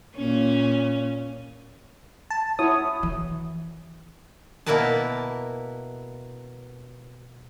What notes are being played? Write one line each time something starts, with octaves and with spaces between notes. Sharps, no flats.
A#2 C#4
A5
E4 F#4 C#5 D#6
E3
B2 A#3 E4 A#4 B4 A5